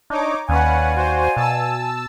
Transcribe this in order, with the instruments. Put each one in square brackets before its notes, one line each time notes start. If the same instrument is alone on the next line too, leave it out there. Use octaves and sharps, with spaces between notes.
[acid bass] D4 [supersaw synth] D#4 C#5 D6
[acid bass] D#2 [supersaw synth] C#4 B4 F#5 [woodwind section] D5 F5 G#5
[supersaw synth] F#4 C5
[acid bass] B2 [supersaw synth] A5 E6